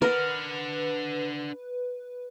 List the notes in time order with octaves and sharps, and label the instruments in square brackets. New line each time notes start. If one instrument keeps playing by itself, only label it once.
[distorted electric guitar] D4 F#5 [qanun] A#4 [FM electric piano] B4